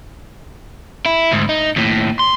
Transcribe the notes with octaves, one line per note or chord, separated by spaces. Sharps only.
E4
D2 G#2
D#4
D#2 A2
C6